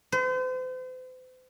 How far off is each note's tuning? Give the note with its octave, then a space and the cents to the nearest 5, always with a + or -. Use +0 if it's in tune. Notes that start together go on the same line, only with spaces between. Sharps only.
C5 -40